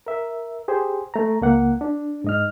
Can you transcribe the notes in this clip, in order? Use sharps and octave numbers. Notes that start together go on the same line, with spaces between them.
A#4 E5
G4 G#4 C5
A3 A#5
C#2 A#3 F#5
D4
G#2 D#5 F6